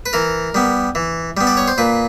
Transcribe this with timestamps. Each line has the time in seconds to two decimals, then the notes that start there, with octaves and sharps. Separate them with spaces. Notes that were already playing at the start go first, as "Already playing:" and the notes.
0.06 B4
0.13 E3 A#4
0.55 G3 B3
0.95 E3
1.37 G3 B3
1.47 D5
1.57 C#5
1.68 C5
1.78 A#2 B4